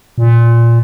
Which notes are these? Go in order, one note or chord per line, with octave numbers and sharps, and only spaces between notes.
A#2